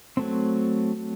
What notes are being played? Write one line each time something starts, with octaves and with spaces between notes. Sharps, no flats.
F#3 A3 C4